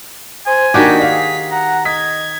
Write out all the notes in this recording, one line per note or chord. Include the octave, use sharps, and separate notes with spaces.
C5 G#5
D#3 A#3 D4 D#4 F#4 G4 B6
D5 F5
G#4
F#5 A#5
D#5 G#6 B6